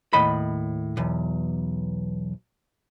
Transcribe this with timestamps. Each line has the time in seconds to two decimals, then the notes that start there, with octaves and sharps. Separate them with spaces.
0.13 D#2 A2 D#5 B5
0.97 B1 E2